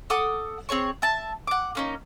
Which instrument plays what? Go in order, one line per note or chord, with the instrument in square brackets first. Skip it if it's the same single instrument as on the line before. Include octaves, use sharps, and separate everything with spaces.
[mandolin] A4 F#5 D6 D#6
C4 G#4 C#5 C#6
E5 A5
F#5 D6
A#3 C#4 D#4